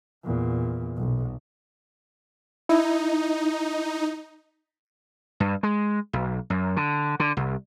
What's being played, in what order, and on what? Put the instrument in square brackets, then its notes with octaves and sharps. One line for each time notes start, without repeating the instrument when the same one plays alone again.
[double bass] E2 A#2
B1
[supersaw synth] D#4 [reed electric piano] E4
[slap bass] G2
G#3
B1
F#2
D3
D3
C2